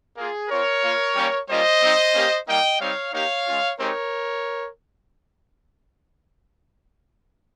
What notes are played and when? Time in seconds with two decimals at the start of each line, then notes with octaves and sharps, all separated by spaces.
0.17 A#3 F4 G#4
0.49 C4 F4 A#4 C#5
0.82 A#3 F4
1.16 G3 A#3 C#4 G4
1.48 G3 A#3 C#4 F4 C5 D#5
1.82 G3 C4 D#4
2.14 A#3 C#4 G4
2.47 G3 A#3 D#4 D#5 G5
2.79 G3 C4 D#4 C#5 F5
3.13 A#3 D#4 G4 C#5 F5
3.46 G#3 C#4 F4
3.78 G#3 C4 D#4 G4 A#4 C#5